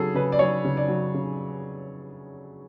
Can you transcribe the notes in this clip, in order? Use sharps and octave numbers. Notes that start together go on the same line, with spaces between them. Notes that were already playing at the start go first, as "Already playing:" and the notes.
Already playing: C#3 F#3 G#4 A4
C#3 B4
D5
F#3 C#5
C#3
D5
F#3
C#3